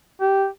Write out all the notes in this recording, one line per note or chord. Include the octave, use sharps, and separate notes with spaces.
G4